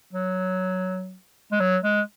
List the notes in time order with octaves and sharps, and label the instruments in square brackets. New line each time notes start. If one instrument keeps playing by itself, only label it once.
[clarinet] F#3
G#3
F#3
G#3